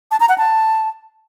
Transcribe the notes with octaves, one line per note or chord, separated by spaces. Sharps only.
A5
A#5
F#5
A5